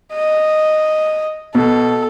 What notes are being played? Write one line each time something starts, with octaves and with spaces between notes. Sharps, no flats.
D#5
B2 A4